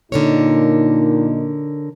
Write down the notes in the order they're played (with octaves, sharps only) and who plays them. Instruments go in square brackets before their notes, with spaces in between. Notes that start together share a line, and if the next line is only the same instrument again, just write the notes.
[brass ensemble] A#2 D#4 [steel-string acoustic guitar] D3 A#4 C#5